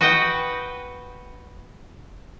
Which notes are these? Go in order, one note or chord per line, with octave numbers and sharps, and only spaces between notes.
F#4 B4 D#5 F#5 G5